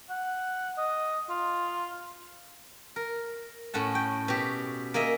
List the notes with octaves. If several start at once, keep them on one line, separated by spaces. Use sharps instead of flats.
F#5
D#5
F4
A#4
A2 C#4 F#5 A5
G5
B2 G4
A#3 G#4 D#5 E5